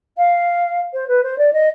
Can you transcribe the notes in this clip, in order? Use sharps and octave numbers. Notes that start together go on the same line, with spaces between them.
F5
C5
B4
C5
D5
D#5